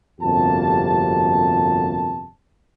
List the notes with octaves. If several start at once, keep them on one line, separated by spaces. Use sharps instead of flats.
G1 F2 C3 A#3 F#4 A5